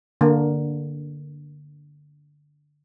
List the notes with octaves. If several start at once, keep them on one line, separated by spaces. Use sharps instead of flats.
D3 A#3